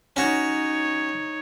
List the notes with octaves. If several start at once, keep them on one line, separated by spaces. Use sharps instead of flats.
C#4 D#4 F#4 C#5